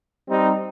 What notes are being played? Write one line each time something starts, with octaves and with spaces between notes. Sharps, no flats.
G3 C4 D#4